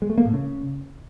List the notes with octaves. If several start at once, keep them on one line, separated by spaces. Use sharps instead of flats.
G#3
A3
A#3
A2
C#3